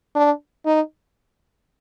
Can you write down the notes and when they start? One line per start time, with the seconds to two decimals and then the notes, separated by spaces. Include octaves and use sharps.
0.16 D4
0.66 D#4